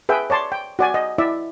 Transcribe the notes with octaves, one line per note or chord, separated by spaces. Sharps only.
G#4 B4 E5 G5
C#5 D5 A5 C6
G5
F#4 D5 G#5
D#5
E4 D5 E5